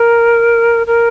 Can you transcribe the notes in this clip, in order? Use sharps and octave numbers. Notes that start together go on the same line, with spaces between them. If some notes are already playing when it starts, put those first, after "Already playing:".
Already playing: A#4
A#4